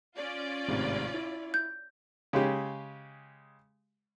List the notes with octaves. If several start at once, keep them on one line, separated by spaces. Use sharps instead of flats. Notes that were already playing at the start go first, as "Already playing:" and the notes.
C#4 F4 D5
G#1 A2 C3
E4
G6
C#3 G#3 G4